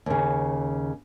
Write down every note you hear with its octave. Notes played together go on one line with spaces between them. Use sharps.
D#2 C#3